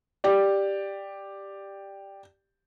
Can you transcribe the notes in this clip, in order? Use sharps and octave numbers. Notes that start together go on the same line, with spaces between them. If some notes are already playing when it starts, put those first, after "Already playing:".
G4 D5